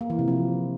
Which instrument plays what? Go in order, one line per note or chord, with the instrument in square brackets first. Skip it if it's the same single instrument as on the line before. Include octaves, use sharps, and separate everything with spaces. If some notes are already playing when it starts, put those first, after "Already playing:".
[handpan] A#3
E3
C3
F3